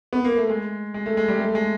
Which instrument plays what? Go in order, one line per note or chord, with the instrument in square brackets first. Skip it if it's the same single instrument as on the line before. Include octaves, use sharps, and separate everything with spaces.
[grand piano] B3
A#3
A3
G#3
G#3
A3
G#3
G3
A3
G#3